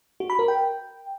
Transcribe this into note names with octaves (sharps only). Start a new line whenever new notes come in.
F#4
B5
A#4
G5